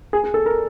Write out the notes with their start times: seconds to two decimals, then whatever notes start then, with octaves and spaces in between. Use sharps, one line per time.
0.13 G#4
0.24 G#4
0.34 A4
0.46 A#4